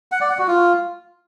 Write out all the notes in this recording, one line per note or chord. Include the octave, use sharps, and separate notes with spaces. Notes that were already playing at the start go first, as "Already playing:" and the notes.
F#5
D5
F#5
F#4
F4